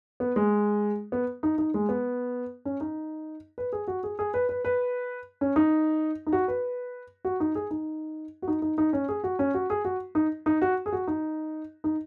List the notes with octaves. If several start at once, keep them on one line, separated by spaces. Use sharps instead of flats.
B3
G#3
B3
D#4
D#4
G#3
B3
C#4
D#4
B4
G#4
F#4
G#4
G#4
B4
B4
B4
C#4
D#4
D#4
F#4
B4
F#4
D#4
G#4
D#4
F#4
D#4
D#4
D#4
C#4
G#4
F#4
C#4
F#4
G#4
F#4
D#4
D#4
F#4
G#4
F#4
D#4
D#4